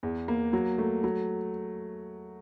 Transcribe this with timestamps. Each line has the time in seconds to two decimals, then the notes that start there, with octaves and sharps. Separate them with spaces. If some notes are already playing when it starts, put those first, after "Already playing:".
0.03 E2
0.28 A#3
0.53 F#3
0.78 A3
1.04 F#3